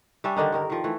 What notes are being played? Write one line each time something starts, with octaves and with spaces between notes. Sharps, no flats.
G3 C#4 D4 E5
D3 D#3 D4 D#4
G2 D#3 A#4
D#3 F3
E3 A3